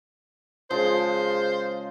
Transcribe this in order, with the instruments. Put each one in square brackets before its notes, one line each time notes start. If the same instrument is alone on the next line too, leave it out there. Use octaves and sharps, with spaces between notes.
[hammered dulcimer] C#3 F3 G#3 [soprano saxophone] C5